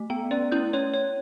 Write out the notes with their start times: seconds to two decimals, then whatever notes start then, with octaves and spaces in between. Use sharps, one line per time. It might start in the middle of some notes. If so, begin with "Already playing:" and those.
Already playing: A3
0.10 B3 G5
0.31 C#4 D5
0.52 C#4 E4 G6
0.73 C#4 C#5
0.94 C#5